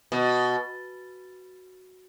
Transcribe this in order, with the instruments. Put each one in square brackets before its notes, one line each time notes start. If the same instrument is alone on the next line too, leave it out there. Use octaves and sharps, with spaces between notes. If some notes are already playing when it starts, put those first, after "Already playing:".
[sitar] B2